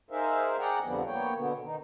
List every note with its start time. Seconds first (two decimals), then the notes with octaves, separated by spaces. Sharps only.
0.11 D#4 G#4 A#4 C5 E5 F5
0.59 G#4 D5 F#5 G5 A#5
0.84 F2 D3 F3 G3 B3
1.06 A#3 B3 C#5 G5
1.35 B2 D3 B3
1.64 D#3 D#4